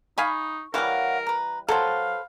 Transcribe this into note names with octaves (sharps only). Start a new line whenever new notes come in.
D#4 F5 G#5 B5 C#6
E3 G3 A#4 C#5 F5 F#5
B4 A#5
F#3 A4 B4 C5 F5